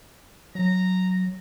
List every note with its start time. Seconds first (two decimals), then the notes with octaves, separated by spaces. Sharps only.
0.55 F#3 A#5